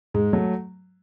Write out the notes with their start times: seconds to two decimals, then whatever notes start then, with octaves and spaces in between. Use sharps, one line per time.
0.14 G#2 G#3
0.33 F#3 A3